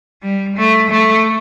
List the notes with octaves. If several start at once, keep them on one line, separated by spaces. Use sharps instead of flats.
G3
A3
A3